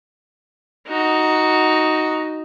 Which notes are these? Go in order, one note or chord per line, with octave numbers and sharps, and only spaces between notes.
D#4 F#4